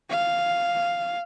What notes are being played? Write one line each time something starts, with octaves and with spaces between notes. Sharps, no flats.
F5